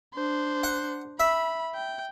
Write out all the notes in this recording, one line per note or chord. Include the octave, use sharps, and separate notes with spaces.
D4 C5
F#5
E5 B5
G5